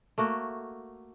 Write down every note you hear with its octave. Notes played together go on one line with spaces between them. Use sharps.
A3 A#3 F#4